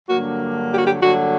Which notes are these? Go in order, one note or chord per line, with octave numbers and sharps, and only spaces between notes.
G2 D3 F#3 A#3 F#4
G4
F#4
G4
G2 D3 F#3 A#3 F#4